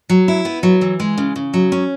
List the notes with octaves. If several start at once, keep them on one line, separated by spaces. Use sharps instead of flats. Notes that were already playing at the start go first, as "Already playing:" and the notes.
F#3
E4
B3
F#3
E3
G#3
C#3
C#3
F#3
C#4